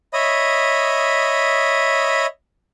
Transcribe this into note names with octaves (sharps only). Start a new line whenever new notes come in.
C#5 D#5 E5 B5 D#6